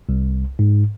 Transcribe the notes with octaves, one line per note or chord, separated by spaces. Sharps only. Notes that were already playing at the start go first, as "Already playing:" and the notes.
C2
G#2